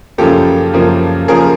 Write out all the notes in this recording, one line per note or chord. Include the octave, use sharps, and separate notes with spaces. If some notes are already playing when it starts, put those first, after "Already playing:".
F#2 C#3 F3 A#3 G4 A4
F#2 C#3 F3 A#3
F#2 C#3 F3 A#3 G#4 A#4